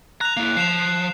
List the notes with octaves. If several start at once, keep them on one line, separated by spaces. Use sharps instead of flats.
A#5 F#6 F7
A#3 E4
F3 C7 E7 F7